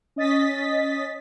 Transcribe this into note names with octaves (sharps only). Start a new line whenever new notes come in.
C#4 D#5 A6 B6